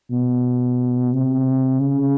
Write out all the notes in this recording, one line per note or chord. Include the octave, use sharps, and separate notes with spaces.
B2
C3
C#3